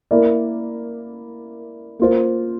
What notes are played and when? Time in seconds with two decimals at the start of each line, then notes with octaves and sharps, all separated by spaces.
0.11 A#3 E4 A#4 D5
1.99 A#3 F4 C5